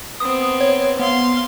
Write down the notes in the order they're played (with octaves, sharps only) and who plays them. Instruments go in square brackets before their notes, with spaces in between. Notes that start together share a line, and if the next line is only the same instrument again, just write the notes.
[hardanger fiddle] B3 C4 [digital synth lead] D#6
[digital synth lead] C#5
[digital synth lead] B3 [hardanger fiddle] F5 C6